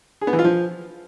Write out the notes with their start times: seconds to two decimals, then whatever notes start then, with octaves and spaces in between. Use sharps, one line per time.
0.21 G#4
0.27 B3
0.33 E3
0.39 F4
0.44 F3